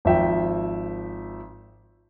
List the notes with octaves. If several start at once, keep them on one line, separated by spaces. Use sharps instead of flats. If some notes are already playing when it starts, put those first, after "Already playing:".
G#1 F3 E5 G5